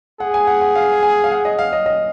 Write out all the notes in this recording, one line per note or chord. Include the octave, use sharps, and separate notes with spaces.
G#4 F#5
G#5
F#5
F#5
F5
G#5
F5
F#5
D#5
F5
D#5
D#5